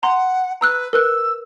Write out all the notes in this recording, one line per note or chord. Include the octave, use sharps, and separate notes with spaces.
F#5 A#5 C6
B4 A#5 E6 F#6
A#4 B4 E6 F#6